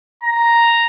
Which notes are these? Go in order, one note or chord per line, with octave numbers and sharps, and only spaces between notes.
A#5